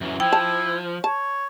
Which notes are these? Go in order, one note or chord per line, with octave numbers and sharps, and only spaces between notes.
F#2 E3 F#3
F3 E4 G5
A5
C#5 A5